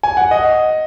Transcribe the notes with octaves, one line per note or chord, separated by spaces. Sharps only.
G#5
F#5
D#5